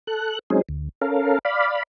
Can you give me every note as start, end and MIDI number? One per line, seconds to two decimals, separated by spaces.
0.07 0.39 69
0.07 0.39 90
0.50 0.62 54
0.50 0.62 56
0.50 0.62 60
0.50 0.62 61
0.50 0.62 63
0.50 0.62 68
0.69 0.89 38
1.01 1.39 61
1.01 1.39 69
1.01 1.39 70
1.01 1.39 77
1.45 1.83 74
1.45 1.83 77
1.45 1.83 83